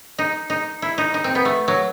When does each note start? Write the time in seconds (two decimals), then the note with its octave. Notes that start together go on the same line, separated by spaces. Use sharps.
0.18 D#4
0.50 D#4
0.82 E4
0.98 D#4
1.14 D#4
1.24 C4
1.35 B3
1.45 A3
1.68 F#3